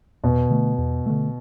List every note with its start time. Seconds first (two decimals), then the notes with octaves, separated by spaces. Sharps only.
0.24 E2 B2
0.50 D3 A3
0.78 E2
1.06 D3 A3